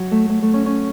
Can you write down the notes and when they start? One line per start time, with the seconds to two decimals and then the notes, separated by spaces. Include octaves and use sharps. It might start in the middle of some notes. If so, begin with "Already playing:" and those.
Already playing: F#3
0.11 A3
0.29 A3
0.42 A3
0.53 C#4
0.66 C#4